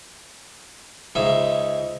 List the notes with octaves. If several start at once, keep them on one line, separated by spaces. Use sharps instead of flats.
C#2 G#2 E5